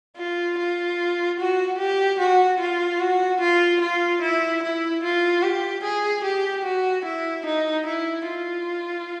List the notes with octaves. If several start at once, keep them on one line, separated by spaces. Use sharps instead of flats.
F4
F4
F#4
G4
F#4
F4
F#4
F4
F4
E4
E4
F4
G4
G#4
G4
F#4
E4
D#4
E4
F4